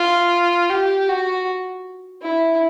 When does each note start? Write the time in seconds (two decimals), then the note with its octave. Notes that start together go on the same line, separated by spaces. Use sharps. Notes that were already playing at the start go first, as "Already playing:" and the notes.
Already playing: F4
0.70 G4
1.08 F#4
2.22 E4